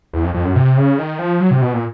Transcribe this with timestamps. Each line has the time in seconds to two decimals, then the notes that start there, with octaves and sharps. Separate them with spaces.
0.14 E2
0.24 F2
0.34 F2
0.44 F#2
0.56 C3
0.77 C#3
0.99 D#3
1.19 F3
1.41 F#3
1.51 C3
1.62 B2
1.73 A#2